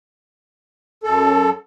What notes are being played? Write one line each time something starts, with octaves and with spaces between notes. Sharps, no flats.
F#2 A4